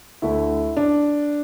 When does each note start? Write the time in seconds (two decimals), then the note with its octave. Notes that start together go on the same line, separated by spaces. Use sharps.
0.22 D2 D3 A3 E4
0.77 D4